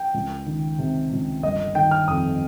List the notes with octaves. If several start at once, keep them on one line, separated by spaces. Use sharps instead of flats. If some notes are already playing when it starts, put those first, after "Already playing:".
Already playing: G5
C#2
D#3
C3
C#2
G1 D#5
D#3 G5
F6
F2 D#6